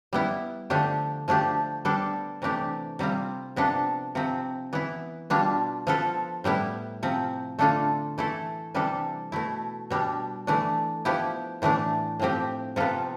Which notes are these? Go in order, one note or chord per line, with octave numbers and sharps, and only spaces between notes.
G3 B3 E4
D3 F3 A3 D4 G4
F3 A3 D4 G4
G3 B3 D4 A4
C3 E3 A3 D4 G4
C3 G3 C4 F4
C3 F3 B3 D4 A4
C3 F3 C4
E3 B3 E4
B2 G3 D4 F4
F3 B3 F4 A4
A2 G3 B3 E4
C3 F3 C4
D3 A3 D4 F4 A4
E3 A3 E4 A4
C3 E3 G3 D4 A4
B2 A3 E4
B2 G3 D4
E3 A3 D4
F3 B3 E4 G4
A2 E3 A3 D4
A2 F3 C4 G4
C3 F3 B3 F4 A4